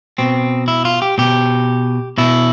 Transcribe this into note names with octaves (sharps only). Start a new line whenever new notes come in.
B2 C4
E4
F4
G4
B2 G4
B2 E4